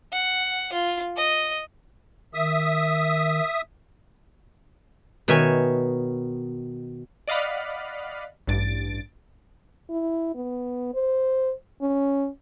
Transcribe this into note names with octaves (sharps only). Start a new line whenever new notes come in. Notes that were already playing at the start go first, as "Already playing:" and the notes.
F#5
F4
D#5
D#3 E5 D#6
B2 D#3 C#5 E5 G#5
D5 D#5 F5 F#5 B5
A1 G2 A6 D7
E4
B3
C5
C#4